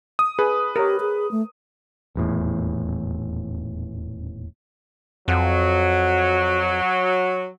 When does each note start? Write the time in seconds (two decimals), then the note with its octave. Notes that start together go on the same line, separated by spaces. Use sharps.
0.19 D#6
0.39 G#4 B4
0.76 G4 A#4 C#5
1.00 G#4
1.31 A3
2.15 D#1 E2 A2
5.28 F2 F#3